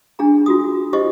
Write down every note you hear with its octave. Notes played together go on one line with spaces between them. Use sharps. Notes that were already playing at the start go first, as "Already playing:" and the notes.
D4 D#4 G#4 A#5
F4 F#4 D#6
E4 G4 C5 D#5 C#6